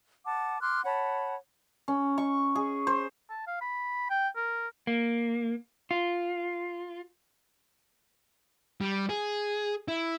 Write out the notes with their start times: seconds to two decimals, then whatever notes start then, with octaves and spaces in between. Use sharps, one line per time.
0.25 F#5 A5 D6
0.61 C6 D6 F6 F#6
0.85 C#5 F#5 A5 B5
1.88 C#4
2.18 C#6
2.55 G#4
2.87 C5
3.30 A5
3.47 F5
3.62 B5
4.10 G5
4.36 A#4
4.87 A#3
5.91 F4
8.81 G3
9.09 G#4
9.88 E4